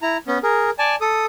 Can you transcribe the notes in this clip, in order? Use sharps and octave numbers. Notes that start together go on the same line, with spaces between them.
E4 A#5
B3 C#4
G#4 A#4
D5 G#5 A5
A4 D#6